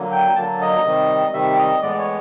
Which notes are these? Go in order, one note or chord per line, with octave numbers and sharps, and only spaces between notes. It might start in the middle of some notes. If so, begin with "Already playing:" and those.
Already playing: D3 F#3 A#3
G5
D3 F#3 A#3 A5
D#5
C3 D#3 G3
C3 D#3 G3 E5
D#5
A2 E3 G#3 B3 D5
D5
C#5